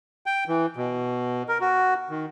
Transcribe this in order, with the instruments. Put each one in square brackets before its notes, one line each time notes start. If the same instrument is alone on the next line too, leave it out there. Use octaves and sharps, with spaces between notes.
[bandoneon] G5
E3
B2
A#4
F#4
D#3